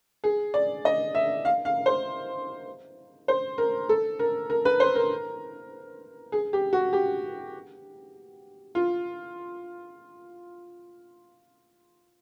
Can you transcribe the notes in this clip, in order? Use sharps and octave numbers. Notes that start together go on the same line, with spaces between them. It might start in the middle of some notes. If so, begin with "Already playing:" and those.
G#4
D5
D#5
E5
F5
F5
C5
C5
A#4
A4
A#4
A#4
B4
C5
A#4
G#4
G4
F#4
G4
F4